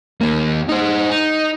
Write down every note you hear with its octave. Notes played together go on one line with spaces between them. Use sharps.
D#2 A#3
D#4 C5
D#4